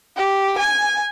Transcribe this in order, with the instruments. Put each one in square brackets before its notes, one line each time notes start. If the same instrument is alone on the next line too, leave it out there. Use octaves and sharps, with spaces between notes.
[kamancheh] G4
G#5